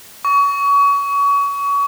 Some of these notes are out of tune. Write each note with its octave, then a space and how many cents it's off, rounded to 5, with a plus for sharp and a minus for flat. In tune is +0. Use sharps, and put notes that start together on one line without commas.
C#6 +30